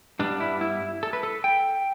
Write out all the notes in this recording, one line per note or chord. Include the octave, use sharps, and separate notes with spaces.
G2 G3 B3 D4
E4
E4
A4
B4
A4
G5